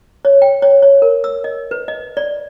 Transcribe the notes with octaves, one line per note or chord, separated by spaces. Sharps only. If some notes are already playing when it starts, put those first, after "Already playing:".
C#5
G5
C#5
C#5
A#4
E6
D#5
B4
D#5
D5